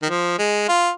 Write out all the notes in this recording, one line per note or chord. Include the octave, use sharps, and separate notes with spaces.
D#3
F3
G#3
F4